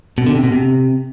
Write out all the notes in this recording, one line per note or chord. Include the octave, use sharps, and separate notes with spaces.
B2
D3
C3
B2
C3